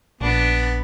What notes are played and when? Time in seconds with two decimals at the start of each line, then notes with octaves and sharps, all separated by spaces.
0.21 A#1 B3 D4